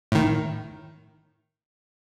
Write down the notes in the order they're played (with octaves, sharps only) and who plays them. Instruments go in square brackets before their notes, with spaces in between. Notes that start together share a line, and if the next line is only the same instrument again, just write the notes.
[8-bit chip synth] A2 D#3